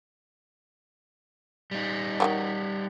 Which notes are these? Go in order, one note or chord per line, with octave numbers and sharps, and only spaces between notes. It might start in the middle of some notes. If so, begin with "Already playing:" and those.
G3 D#4
D#3 E3 F#3